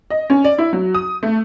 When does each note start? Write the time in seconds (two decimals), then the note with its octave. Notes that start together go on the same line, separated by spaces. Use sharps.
0.10 D#5
0.30 C#4
0.45 D5
0.58 E4
0.73 F#3
0.95 D#6
1.23 A3